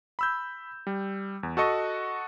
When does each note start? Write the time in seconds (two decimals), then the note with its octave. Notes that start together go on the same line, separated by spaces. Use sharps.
0.19 B5 E6 G6
0.87 G3
1.43 E2
1.57 F#4 A4 D#5 C#6